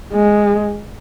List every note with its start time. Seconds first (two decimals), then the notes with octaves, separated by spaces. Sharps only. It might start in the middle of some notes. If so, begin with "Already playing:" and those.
0.13 G#3